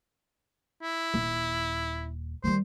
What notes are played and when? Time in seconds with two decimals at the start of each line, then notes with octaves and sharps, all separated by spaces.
0.83 E4
1.14 D#1
2.44 D#3 G3 C5